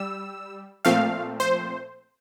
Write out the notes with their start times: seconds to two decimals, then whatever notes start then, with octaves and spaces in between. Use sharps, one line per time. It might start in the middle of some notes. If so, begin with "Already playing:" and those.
Already playing: G3 E6
0.85 A#2 F3 A3 C4 F5
1.40 C5